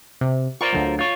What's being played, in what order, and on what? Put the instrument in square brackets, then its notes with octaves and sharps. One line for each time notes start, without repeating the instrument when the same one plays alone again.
[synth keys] C3
[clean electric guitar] F4 A#4 C5 [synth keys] D5 F5 C#6
[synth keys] D2 D3 F#3
[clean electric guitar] F4 C#5